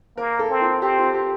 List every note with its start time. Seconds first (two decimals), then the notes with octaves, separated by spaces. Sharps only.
0.17 A#3 A#4
0.39 A4
0.49 C4
0.61 F4
0.82 C4 G4
0.99 F4
1.14 G4